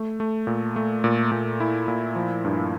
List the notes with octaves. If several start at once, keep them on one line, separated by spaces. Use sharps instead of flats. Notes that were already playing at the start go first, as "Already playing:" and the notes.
Already playing: A3
A3
A#2
A3
A#2
A#2
E4
A#2
F3
G2